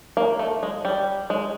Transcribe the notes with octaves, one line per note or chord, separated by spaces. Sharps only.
A#3
A3
G#3
G3
G#3